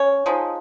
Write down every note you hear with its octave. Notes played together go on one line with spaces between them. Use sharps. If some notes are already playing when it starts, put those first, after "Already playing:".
Already playing: C#4 C#5
F3 G#3 D#4